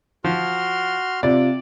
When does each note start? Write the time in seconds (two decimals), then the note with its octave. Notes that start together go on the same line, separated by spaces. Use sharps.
0.24 F3 F#4 C6 F6
1.23 C3 F4 D5